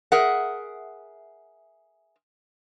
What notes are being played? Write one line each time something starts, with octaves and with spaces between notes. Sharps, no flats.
G#4 A#4 E5 F#5